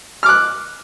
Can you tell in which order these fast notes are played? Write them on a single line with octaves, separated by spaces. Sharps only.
F6 D6 F#6